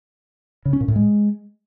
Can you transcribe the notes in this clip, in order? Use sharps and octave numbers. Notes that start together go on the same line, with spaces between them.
C#3
C#4
A#2
A2
G#3